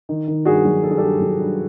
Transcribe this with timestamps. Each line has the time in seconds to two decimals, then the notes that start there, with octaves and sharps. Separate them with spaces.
0.09 D#3
0.28 D#3
0.45 G2 F#4 G#4
0.65 F#3
0.83 G2 A4
0.91 G#4
0.98 G2 G4 A4
1.20 F#3
1.39 G2